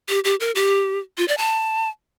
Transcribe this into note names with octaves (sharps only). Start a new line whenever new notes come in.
G4
G4
A#4
G4
F4
D5
A5